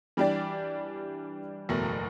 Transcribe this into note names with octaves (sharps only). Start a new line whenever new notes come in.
E3 G3 D4 G4 D5
F#1 E2 B2 A3